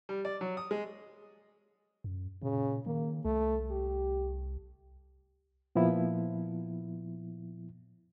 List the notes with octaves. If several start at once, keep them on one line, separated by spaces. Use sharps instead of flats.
G3
D5
F#3
D#6
G#3
F#2
A#2 C#3
D#3 A#3
C2 A3
G4
A#2 F3 B3 E4